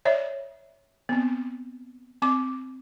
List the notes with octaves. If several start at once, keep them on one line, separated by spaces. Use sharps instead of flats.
C#5 D5 E5
B3 C4
C4 D6